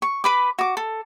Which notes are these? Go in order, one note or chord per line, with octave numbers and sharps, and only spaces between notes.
C#6
B4 B5 D6
F#4 D6
A4